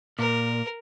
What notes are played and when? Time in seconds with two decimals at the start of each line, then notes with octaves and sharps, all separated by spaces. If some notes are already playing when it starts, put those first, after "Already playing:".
0.19 A#2 A#4